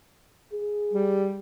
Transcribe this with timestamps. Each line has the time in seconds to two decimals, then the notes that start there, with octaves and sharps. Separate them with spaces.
0.53 G#4
0.93 G3